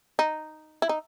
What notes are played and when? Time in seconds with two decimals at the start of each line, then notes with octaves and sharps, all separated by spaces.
0.19 D#4
0.82 E4
0.89 D#4